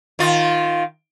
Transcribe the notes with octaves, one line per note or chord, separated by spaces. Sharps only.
D#3 F4